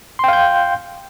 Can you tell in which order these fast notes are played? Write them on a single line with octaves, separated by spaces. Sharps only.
C6 G5 F5 G6